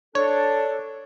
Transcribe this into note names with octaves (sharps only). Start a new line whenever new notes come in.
D4 A4 C#5